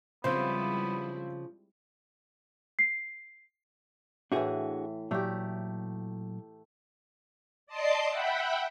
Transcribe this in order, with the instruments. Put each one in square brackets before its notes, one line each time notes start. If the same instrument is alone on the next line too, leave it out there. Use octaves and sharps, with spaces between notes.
[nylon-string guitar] C#3 F3 [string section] G3 G#3 E4 [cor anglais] B3 [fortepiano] C4 C5
[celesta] C7
[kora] A2 E3 [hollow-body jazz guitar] D4 F#4 G#4
[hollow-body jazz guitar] A#2 F#3 [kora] A3 G4
[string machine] D5 D#5 A5 C6 D6 C7
E5 F#5 G5 B5